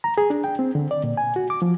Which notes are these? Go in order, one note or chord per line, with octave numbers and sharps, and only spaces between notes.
A#5
G#4
D4
G5
C4
D3
D5
A#2
G#5
F#4
D6
F3